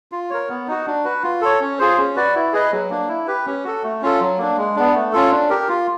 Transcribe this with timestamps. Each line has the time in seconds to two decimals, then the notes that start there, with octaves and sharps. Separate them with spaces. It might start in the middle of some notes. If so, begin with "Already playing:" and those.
0.12 F4
0.30 A#4 C#5
0.49 B3
0.68 D#4 F#4
0.86 D4
1.04 F#4 B4
1.23 F4
1.41 A4 C#5
1.61 C#4
1.79 F4 G#4 C5
1.97 C#4
2.16 F#4 B4 D5
2.35 E4
2.53 G#4 B4 D#5
2.72 F#3
2.90 A#3 D4
3.08 E4
3.27 G4 B4
3.46 C#4
3.64 F#4 A4
3.83 A3
4.02 C#4 F4 A4
4.20 F#3
4.38 A#3 D4
4.57 G#3
4.76 B3 D4
4.94 A3
5.13 C#4 F4 A4
5.31 D4
5.50 G4 A#4
5.68 F4